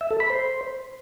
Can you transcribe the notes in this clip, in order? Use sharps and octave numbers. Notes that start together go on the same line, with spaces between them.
E5
A4
B5
C5